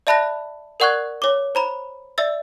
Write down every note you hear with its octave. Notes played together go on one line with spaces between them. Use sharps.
D5 E5 A5 B5 F#6 A#6
A#4 D5 F#5 C#6 F#6 G#6
C#5 D6
C5 A#5 B5
D5 E5 E6 A6